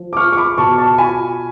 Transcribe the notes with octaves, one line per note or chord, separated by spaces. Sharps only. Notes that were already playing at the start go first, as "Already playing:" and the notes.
Already playing: F3
D6
F4 C#6 F6
C#6
B5 D6
B2 A5 C#6
A5 C#6
F4 G#5 B5